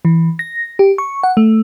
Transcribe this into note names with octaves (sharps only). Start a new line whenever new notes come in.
E3
A#6
G4
C#6
F#5
A3